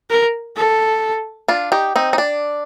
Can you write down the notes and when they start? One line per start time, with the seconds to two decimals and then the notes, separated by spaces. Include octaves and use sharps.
0.10 A#4
0.56 A4
1.48 D4 F4
1.72 D#4 G4
1.96 C4 D#4
2.13 D#4
2.18 D4